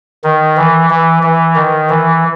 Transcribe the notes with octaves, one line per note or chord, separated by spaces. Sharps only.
D#3
E3
E3
E3
D#3
E3